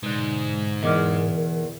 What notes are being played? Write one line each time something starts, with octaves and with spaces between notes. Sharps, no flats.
G#2 B2 D3
E2 A#4 D#5 D6 F6